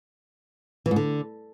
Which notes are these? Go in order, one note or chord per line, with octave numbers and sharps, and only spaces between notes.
E3
G#2
D3